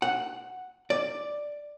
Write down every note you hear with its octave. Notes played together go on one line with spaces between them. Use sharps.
F#5
D5